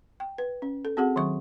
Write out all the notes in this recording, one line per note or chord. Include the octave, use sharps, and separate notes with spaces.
G5
B4
C#4
A4
C4 F#4 G#4 F#5
D#3 F#3 C#6